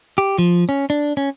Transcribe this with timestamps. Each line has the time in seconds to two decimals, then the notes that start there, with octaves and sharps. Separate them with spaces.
0.18 G4
0.38 F3
0.69 C#4
0.90 D4
1.17 C#4